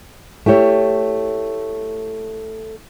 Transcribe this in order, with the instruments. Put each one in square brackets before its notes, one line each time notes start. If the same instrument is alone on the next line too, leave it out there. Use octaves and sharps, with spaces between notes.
[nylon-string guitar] A3 E4 G4 C#5